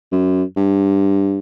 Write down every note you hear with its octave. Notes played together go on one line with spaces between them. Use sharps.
F#2
G2